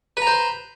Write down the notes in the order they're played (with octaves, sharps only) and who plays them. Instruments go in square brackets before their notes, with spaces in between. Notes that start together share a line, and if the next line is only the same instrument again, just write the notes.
[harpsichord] B4
A#5
C5